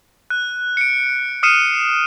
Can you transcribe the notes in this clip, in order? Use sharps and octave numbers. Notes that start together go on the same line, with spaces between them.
F#6
C#7 D7
D#6 F6 C7 C#7 D#7 E7